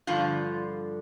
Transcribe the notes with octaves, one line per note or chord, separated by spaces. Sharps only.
G2 D3 F3 F4